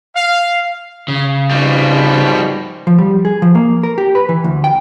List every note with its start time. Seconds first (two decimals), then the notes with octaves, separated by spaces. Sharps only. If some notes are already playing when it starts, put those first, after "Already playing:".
0.15 F5
1.08 C#3
1.50 G#1 B2 F3 G3 G#3
2.87 F3
2.99 G3
3.25 G#4
3.42 F3
3.55 A#3
3.83 A#4
3.98 G4
4.15 B4
4.29 E3
4.44 D2
4.64 G5